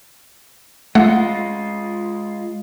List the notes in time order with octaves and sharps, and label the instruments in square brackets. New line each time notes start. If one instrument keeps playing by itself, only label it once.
[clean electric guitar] G#3 F4 [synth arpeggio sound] A3 F#5